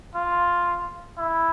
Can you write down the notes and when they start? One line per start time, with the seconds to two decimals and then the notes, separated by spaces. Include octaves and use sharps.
0.15 F4
1.18 E4